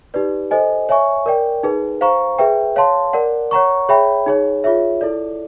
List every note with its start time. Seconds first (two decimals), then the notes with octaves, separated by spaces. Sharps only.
0.14 D#4 G4 B4 D5
0.51 A4 C5 D#5 G#5
0.89 C#5 E5 G#5 C#6
1.26 A#4 D5 G5
1.63 D#4 G#4 B4
2.01 C5 F5 A#5 C#6
2.38 G#4 B4 E5 G5
2.76 C#5 F5 A5 C6
3.13 A#4 D5 F#5
3.51 C#5 F#5 A#5 C#6
3.89 G#4 C#5 E5 G5 B5
4.26 D#4 G#4 C#5
4.64 F4 G#4 C#5 E5
5.01 E4 A4 D5